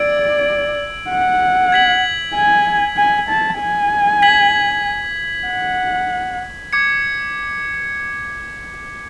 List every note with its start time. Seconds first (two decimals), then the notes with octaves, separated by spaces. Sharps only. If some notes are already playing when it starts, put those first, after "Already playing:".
Already playing: D5 E6 G#6 D7 F#7
1.10 F#5
1.72 G#6 B6 F#7
2.35 G#5
2.97 G#5
3.29 A5
3.60 G#5
4.22 G#6 B6 F#7
5.47 F#5
6.73 D6 G#6 C#7